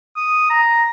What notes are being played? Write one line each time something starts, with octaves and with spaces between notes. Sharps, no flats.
D#6
A#5